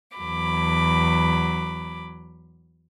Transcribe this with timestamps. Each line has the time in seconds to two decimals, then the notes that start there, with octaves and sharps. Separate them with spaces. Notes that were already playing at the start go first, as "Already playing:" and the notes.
0.17 E2 F#3 B5 D6